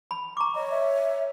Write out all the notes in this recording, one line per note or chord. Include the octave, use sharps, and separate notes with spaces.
B5
A#5 C#6 D6
C#5 D#5
E5